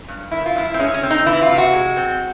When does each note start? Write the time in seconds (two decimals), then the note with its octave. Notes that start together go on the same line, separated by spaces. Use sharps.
0.08 G2
0.31 D#3 E4
0.46 F4
0.55 G2 E4
0.74 C4
0.79 G#3 C#4
0.94 C#4
1.03 C4
1.11 D#4
1.26 E3 E4
1.42 F4
1.50 C3
1.58 F#4
1.74 G#3
1.97 C4